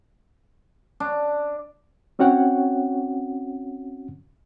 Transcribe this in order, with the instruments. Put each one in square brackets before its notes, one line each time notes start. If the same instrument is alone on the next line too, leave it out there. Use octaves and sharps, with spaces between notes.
[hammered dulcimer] D4
[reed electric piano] C4 C#4 F#4 C#5 F#5 G5